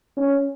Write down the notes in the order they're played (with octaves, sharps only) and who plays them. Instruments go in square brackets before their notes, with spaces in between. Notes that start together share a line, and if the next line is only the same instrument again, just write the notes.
[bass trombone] C#4